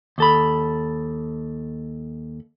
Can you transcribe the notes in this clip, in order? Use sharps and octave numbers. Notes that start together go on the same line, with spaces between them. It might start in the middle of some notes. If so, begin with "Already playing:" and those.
D#2 A4 B5